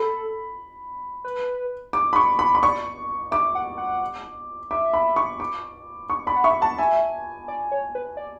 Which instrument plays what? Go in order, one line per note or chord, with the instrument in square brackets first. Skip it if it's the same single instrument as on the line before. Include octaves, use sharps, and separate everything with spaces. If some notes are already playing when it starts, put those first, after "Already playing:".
Already playing: [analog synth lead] A4 [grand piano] B5
[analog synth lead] B4
[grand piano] D6
B5
C#6
B5
B5
[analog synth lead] D5 [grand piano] C#6
[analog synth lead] E5 [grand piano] D6
[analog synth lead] F#5
F#5
[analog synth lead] E5 [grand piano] D6
[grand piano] B5
C#6
D6
C#6
[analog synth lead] D5 [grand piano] B5
[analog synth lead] F#5
[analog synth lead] E5 [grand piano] C#6
[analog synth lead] F#5 [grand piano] A5
[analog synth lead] E5 [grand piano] G#5
[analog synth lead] D5
C#5
B4
D5